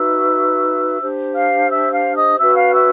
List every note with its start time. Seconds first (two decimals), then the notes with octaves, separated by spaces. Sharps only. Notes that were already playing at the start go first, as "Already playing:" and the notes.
Already playing: D#4 F#4 B4 E5 E6
1.00 D4 G4 C5
1.34 F5 F6
1.69 E5 E6
1.92 F5 F6
2.15 D#5 D#6
2.38 C#4 F#4 B4 E5 E6
2.56 F5 F6
2.73 E5 E6